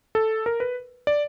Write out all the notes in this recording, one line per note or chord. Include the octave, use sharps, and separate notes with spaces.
A4
A#4
B4
D5